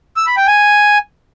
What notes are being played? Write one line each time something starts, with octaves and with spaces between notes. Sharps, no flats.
E6
B5
G5
G#5